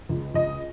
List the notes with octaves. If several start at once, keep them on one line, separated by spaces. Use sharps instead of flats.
C#2
C#2 D#5